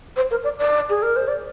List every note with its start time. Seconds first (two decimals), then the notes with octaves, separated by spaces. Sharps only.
0.16 C5
0.31 A#4
0.44 D5
0.59 D5
0.90 G#4
1.03 A#4
1.16 C5
1.28 D5